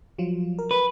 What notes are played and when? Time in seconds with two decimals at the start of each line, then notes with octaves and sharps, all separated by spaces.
0.18 F3 F#3 F4
0.59 A#4
0.71 B4